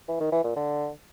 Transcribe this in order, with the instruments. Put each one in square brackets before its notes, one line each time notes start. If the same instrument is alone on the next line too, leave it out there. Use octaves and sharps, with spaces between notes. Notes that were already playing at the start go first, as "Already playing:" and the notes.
[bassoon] E3
D#3
E3
A#2
D3